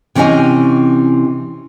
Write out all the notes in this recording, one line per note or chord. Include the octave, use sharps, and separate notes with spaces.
C3 E3 C4 C#4 D#5 G#5